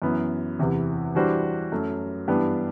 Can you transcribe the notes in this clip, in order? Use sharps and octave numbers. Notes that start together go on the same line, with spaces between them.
F#2 E3 B3
E2 C3 E3
E3 G3 D4 F#4 C5
F#2 F#3 A3
G2 E3 B3 D4 G4